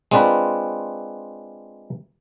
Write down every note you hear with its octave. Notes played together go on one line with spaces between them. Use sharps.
G#3 C4 D4 F4 B4